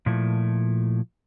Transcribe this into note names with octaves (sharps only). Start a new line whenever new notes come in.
A#2 F3 A3 E4